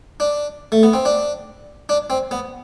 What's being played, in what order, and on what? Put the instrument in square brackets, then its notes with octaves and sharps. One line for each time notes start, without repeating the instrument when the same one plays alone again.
[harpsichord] D4
A3
B3
C4
D4
D4
C4
B3